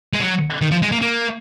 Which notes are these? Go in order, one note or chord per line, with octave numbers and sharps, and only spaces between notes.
G#3
F#3
D#3
F3
G#3
A#3
A#3